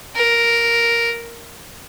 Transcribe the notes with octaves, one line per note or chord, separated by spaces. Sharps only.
A#4